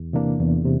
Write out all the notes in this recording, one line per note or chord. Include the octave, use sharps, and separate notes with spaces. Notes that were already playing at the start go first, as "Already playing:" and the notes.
Already playing: E2
C3 E3 A#3 D4
E2
C3